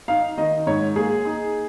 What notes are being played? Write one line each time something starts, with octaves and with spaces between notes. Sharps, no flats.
D#4 F5
D#3 D#5
G#2 C#5
A#3 G#4
D#4